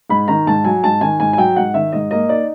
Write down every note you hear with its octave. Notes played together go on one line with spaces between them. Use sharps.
G#2 B5
D#3 A#5
G#2 A5
F#3 G#5
G#2 A5
D#3 G#5
G#2 G#5
G#5
F#3 G5
G#2 F#5
D#3 E5
G#2 D#5
A#3 D#5
D#4 D5